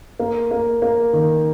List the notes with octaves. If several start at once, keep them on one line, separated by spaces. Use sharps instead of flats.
A#3
A#3
A#3
D#3